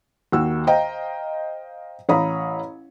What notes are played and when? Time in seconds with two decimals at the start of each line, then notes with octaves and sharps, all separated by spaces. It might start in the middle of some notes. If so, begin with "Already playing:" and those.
0.32 D#2 A#3 F#4 E6
0.67 C5 D#5 F5 G5 A#5
2.09 A1 C#5 F5 A#5 B5 D#6